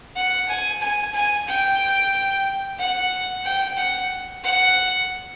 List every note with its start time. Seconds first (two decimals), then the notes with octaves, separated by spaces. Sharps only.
0.15 F#5
0.48 G#5
0.81 G#5
1.14 G#5
1.47 G5
2.79 F#5
3.44 G5
3.77 F#5
4.44 F#5